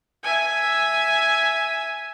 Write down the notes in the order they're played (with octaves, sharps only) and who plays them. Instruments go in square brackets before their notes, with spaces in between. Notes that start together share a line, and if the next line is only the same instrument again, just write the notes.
[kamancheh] E5 G#5